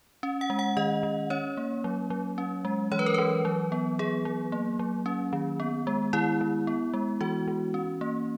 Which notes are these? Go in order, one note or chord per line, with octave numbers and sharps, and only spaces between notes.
C#4
F#5
G#3
F#5
D#3 D#5
D#3
C#4 C#5
A#3
F#3
F#3
C#4
G#3
E3 C#5
B4
A#4
E3 B4
F#3
B3
B3 G#4
F#3
A#3
F#3
C#4
D#3
B3
G#3
D#3 E4
D#3
B3
G#3
E3 F#4
E3
C#4
A#3